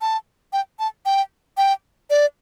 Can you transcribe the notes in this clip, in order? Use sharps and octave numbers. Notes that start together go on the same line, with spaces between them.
A5
G5
A5
G5
G5
D5